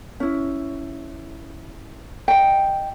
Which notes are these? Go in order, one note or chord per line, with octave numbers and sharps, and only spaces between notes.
C#4 E4
D#5 G5